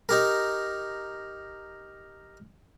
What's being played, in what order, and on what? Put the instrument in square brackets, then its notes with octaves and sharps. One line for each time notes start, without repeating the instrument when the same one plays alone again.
[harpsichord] D#4 G4 A#4